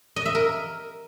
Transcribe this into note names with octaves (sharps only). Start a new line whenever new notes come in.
D#5
E5
A#4